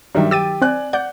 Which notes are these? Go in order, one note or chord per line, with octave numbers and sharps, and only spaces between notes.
G2 D#3 F#3 G3 E5
G4 G5 E6 A6 D#7
C4 D5 G#5 F#6
D5 F#5 G6